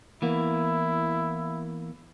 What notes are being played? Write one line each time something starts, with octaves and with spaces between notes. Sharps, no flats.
E3 A#3 B3 E4